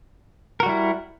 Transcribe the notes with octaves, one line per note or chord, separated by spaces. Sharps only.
G3 E4 F#4 A#4